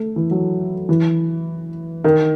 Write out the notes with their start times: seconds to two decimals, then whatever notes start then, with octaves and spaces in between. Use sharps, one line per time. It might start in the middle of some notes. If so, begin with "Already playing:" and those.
Already playing: A3
0.16 E3
0.31 F#3
0.89 E3
2.04 D#3